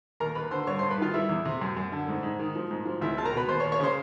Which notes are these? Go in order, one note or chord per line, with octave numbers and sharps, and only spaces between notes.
D#2 A#4 A#5
D#2 B4 B5
D3 C5 C6
G2 C#5 C#6
G2 C5 C6
B4 B5
D#3 F4 F5
G3 E4 E5
E2
C3
F#2
F#2
D3
G#2
G#2
D#3
F3
G#2
F3
C#2 E4 E5
C#2 A5
A#4 A#5
B2 B4 B5
D#2 C5 C6
C#5 C#6
D#2
C#5 C#6
C#3 C5 C6